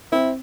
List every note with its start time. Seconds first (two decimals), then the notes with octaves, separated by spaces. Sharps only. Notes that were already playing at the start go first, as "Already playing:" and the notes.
0.12 C4 E4